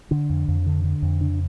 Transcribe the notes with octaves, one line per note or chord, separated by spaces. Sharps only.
D3 D4
F2
F2
D3
D3
F2
C#3 D4